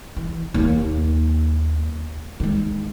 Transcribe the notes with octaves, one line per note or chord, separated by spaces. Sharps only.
E3
D#2 A#3
D#3 G#3